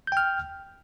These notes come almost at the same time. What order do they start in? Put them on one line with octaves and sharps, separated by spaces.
G6 G5 F6